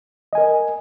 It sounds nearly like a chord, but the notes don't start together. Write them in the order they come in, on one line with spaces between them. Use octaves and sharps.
D#5 G#5 A#4